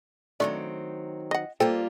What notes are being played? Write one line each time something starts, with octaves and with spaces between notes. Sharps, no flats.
D#3 F#3 A3 C4 D4 D5
D#5 F#5
G3 A#3 F4 A4 C5 G5